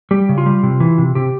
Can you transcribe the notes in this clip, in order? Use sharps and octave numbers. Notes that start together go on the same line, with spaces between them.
G3 G4
C#3
F4
G3
C3
E3
C3
C3 G4